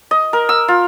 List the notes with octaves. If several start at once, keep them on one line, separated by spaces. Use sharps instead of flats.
D#5
A#4
E6
F4